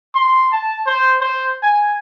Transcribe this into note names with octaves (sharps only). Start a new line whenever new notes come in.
C6
A5
C5
C5
G#5